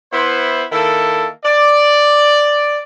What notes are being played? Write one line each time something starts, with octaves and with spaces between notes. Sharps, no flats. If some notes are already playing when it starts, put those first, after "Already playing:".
B3 E4 C5
D#3 A#3 E4 A4
D5